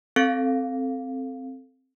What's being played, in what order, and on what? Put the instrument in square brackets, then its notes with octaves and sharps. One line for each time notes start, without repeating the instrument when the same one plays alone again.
[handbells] C4 A4 F5